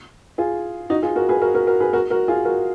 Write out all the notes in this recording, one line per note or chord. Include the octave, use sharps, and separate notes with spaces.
F4 G#4
D#4 F#4
F4 G#4
F#4 A#4
G#4 B4
F#4 A#4
F#4 A#4
F#4 A#4
G#4 B4
F#4 A#4
F#4 A#4
F4 G#4
F#4 A#4